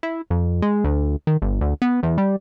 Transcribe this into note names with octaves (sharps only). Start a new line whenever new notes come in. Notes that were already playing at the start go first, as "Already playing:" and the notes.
E4
F2
G#3
D2
D#3
G1
D2
B3
E2
G3